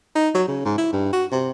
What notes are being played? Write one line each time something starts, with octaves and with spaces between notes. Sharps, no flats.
D#4
F#3
C#3
G#2
E4
G2
F#4
C3